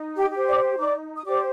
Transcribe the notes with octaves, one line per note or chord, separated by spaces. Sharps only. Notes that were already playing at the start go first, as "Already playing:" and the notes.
Already playing: D#4
G4 G5
G4
C5
D5 D6
D#4 D5 D6
D#6
G4 C5 D5 D6